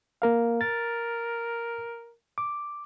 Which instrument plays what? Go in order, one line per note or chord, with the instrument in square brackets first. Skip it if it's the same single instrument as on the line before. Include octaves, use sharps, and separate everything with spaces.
[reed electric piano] A#3 A#4 F5
[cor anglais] A#4 [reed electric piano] A6
[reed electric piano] D6